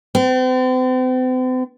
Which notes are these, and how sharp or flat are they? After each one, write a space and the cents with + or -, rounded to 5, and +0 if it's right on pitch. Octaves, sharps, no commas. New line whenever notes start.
C4 -40